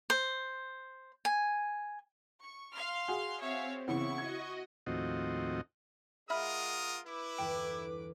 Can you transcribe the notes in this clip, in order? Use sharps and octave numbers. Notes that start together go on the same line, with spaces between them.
C5
G#5
C#6
F5 C6 F6
F#4 G#4
C4 C#5 E5 F5
C#3 E3 B3 E4 C#6
F#4 D#5 G#6
D#2 A2 F3 C4 F#4 D#5
G#3 F4 A#4 E5 F#5 B5 D#6 F6
E4 B4 D6
G1 E2 G5